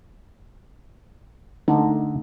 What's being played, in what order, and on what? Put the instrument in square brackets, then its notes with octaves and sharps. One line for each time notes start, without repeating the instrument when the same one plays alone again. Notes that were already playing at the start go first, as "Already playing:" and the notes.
[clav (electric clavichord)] D3 [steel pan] A3 D#4